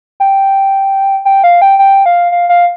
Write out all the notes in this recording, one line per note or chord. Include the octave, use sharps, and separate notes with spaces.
G5
G5
F5
G5
G5
F5
F5
F5